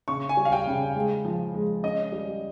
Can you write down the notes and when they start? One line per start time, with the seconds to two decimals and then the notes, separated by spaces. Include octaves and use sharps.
0.08 C#3 C#6
0.29 G#5
0.37 G3
0.45 F5
0.52 G5
0.67 C#3
0.96 G#3
1.25 F3
1.54 G#3
1.83 C#4 D#5
2.12 G3